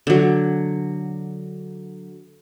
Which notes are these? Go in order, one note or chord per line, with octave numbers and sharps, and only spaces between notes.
D3 F#3